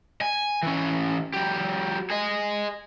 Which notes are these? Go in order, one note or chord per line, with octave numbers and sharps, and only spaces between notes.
G#5
E3 C#4
F#3 G4
G#4 D#5